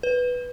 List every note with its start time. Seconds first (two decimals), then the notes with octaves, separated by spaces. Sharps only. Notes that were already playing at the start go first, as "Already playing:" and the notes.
0.03 B4